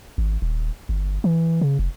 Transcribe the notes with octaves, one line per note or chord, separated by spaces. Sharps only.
G#1
D#1
G1
E3
C#3
F1